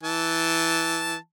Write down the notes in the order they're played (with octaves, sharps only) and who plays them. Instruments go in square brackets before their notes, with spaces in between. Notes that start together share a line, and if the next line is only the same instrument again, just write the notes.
[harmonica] E3 A5